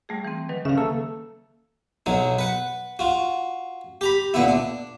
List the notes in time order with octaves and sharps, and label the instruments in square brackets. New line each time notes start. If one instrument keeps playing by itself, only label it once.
[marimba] G3 A3 G#4
E3 C4
D#3 F#3 B4
[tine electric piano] C#3 [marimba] E5 F5
[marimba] A#3 [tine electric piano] A4
[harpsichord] B1 F#3 D#4
B4 F#5
F4 F#4
G4 A#5 B5
A#2 D3 B3 E4
D4